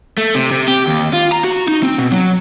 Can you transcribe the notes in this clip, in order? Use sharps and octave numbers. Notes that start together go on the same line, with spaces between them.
A3
C3
C3
G4
D#2
F4
A#5
F#4
D#4
C4
B2
F#3